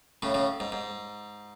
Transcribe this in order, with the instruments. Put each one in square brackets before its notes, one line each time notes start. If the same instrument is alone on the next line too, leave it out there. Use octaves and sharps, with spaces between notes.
[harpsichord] A2 C#3
A2 C#3
G#2
G#2